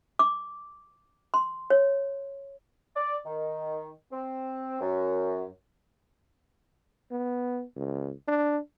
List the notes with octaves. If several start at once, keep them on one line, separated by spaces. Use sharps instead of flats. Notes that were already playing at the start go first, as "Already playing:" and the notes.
D6
C6
C#5
D5
D#3
C4
F#2
B3
C#2
D4